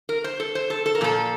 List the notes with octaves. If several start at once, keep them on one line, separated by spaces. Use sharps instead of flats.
A#4
C5
A4
C5
A4
A4
A#4
A#2 F3 A4